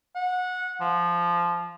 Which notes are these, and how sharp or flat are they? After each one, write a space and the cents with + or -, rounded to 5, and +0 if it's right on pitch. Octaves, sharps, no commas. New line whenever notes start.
F#5 -20
F3 -10